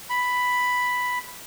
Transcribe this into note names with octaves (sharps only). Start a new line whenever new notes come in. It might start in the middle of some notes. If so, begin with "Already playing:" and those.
B5